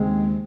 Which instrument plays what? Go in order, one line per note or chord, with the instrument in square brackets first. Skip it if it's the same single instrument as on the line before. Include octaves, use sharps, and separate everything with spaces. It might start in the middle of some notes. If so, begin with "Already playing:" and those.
Already playing: [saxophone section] D#2 C#3 G#3 C4